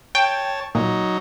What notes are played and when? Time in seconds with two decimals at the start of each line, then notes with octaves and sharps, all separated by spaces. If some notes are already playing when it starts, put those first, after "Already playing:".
0.15 C#5 G5 A5
0.75 A#2 F#3 D#4